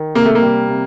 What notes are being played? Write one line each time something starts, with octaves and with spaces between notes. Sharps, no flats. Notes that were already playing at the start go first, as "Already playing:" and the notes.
Already playing: D#3
C3 A#3
A3
A#3
G3
C3